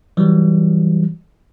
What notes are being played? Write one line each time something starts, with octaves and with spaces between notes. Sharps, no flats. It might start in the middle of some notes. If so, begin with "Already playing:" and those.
E3 F#3 G3